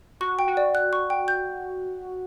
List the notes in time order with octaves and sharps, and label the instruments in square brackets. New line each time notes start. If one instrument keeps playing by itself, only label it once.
[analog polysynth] F#4 [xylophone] C#6
[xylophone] G5
[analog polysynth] F#4
[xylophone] D5
F#6
C#6
G5
G6